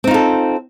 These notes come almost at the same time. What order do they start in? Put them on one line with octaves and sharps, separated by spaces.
C4 D#4 F4 A4